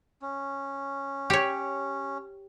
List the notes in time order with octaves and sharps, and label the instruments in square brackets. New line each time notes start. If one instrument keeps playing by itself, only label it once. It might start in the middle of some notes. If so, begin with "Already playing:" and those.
[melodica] C#4
[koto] G4 C#5